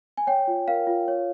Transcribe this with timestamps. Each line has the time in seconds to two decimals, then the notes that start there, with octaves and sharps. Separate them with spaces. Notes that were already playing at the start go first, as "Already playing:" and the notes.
0.17 G#5
0.27 C#5 G5
0.47 F4
0.68 A#4 F5
0.87 F4
1.08 C#5